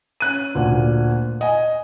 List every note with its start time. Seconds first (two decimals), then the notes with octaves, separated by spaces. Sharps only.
0.20 C#4 F#6 D#7
0.55 D2 A#2
1.41 D#5 G#5